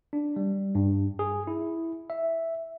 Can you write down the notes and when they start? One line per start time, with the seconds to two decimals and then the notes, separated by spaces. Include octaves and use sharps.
0.13 D4
0.36 G3
0.75 G2
1.19 G#4
1.47 E4
2.10 E5